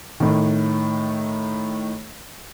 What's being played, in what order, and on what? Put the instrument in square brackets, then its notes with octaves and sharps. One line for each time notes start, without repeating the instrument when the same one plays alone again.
[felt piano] A2 D#3